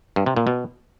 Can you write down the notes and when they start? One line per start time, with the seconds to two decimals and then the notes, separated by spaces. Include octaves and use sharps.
0.16 G2
0.26 C3
0.36 A#2
0.47 B2